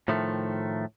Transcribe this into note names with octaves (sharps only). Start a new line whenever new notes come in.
A2 D#3 F3 A3